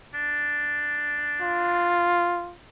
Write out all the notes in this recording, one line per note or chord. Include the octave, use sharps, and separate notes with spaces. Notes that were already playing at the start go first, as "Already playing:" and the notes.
D4
F4